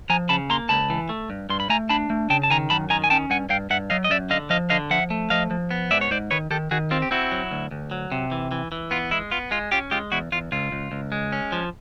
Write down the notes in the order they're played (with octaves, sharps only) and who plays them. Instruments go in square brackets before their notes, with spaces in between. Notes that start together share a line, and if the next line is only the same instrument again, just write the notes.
[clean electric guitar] F3 G#5 A#5
C#3 A5 B5
A#3 A#5 C6
C#2 A5 B5
E3
A3
G2
G2 C6
B5
A3 G#5 A#5
D4 A5 B5
A3
C#3 G5 A5
A5
D#3 G#5 A#5
F#2 A5 B5
D#3 G#5 A#5
G#5
C#4 G5 A5
G2 F#5 G#5
G2 F5 G5
G2 E5 F#5
F#3 D#5 F5
D#5
F#2 D5 E5
D3 D#5 F5
F3 D#5 F5
D3 D#5 F5
F3 E5 F#5
A3
F3 D#5 F5
F3
B3
G#2 D5 E5
C#5
G#2 C5 D5
D#3 B4 C#5
D#3 G4 A4
D#3 F#4 G#4
C4 F4 G4
G4
C4 E4 F#4
F#3
D2
D2
F#3
C3
E3
E3
E3
B3 F4
G#3 E4
B3 F4
G#3 F4
C#4 F4 G4
G#3 F4 G4
E2 E4 F#4
E2 F4
C#2 F4
C#2
C#2
G#3
C#4
F3